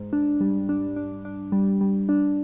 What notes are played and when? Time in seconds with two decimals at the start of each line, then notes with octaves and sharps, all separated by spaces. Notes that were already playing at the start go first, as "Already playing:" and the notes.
Already playing: G#2
0.13 D4
0.41 G3
0.69 D4
0.96 D4
1.25 D4
1.52 G3
1.81 G3
2.09 D4